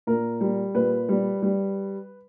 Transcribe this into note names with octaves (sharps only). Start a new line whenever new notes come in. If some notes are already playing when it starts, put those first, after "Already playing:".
A#2 A#4
G3
A#2 B4
G3
G3